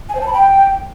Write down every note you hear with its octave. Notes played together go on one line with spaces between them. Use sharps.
G#5
C5
A5
B5
G5